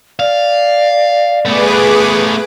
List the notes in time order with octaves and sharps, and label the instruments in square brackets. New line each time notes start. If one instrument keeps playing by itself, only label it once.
[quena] D5 [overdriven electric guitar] F5
[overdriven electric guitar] A3 B3 [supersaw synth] G#4 B4 D6